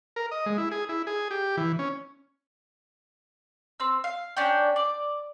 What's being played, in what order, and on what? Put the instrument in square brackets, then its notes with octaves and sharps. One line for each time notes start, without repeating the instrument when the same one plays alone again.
[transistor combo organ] A#4
D#5
G#3
E4
G#4
E4
G#4
G4
E3
C#4
[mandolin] C4 E6
F5
C#4 D4 D5 G5
D5